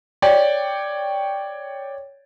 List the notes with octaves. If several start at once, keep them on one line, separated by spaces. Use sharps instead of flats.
C#5 D5 G5